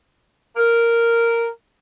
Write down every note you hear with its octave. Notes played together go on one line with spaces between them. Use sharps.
A#4